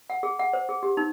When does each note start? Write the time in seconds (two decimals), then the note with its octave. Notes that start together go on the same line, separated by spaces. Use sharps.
0.10 F#5
0.23 G#4
0.39 F#5
0.53 C5
0.69 G#4
0.83 G4
0.97 D#4